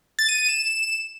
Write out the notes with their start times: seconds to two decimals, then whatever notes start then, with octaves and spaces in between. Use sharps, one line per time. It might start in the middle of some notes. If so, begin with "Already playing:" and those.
0.19 A6
0.29 D#7
0.39 D#7
0.49 E7